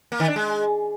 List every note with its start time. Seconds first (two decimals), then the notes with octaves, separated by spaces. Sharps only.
0.12 A#3
0.20 D#3
0.28 D4
0.36 G#3